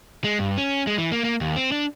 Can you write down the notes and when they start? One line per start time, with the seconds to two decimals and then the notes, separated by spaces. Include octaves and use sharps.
0.24 G#3
0.39 G2
0.57 C#4
0.87 G#3
0.98 E3
1.12 A#3
1.25 A#3
1.41 D#2
1.57 C4
1.72 D4